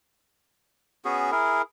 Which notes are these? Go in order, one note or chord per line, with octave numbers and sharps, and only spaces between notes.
B3 C#4 F#4 G#4
E4 G#4 A#4